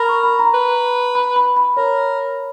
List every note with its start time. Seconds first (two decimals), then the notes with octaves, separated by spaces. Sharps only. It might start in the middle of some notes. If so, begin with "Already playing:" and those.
Already playing: A#4 B5
0.09 C#6
0.23 B5
0.39 A#5
0.54 B4
1.15 B5
1.36 B5
1.56 B5
1.76 A#4 C#5